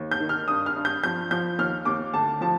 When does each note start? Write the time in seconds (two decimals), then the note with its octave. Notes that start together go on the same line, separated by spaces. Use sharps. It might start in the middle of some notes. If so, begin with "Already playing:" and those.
Already playing: D#2
0.11 G6
0.20 D#3
0.29 F6
0.48 G2 D#6
0.66 F6
0.76 G2
0.85 G6
1.04 F3 G6
1.31 F3 G6
1.58 D#2 F6
1.85 D#2 D6
2.14 D2 A5
2.41 F3 A5